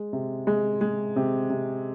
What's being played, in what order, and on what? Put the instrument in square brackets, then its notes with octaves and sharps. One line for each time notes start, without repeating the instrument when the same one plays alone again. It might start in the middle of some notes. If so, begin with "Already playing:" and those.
Already playing: [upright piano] G#3
C3
G#3
G#3
C3
C3